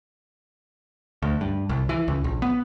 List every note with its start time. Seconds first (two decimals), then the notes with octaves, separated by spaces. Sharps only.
1.22 D2
1.41 G2
1.69 C2
1.89 E3
2.08 C#2
2.24 A#1
2.42 B3